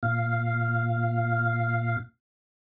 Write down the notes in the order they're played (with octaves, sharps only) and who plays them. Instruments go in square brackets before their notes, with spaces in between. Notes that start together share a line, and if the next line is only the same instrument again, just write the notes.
[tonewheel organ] A#2 F5